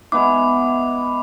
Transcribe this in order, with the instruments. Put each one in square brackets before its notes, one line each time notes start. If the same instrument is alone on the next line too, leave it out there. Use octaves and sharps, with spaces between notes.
[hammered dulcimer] G#3 B3 E4 [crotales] D6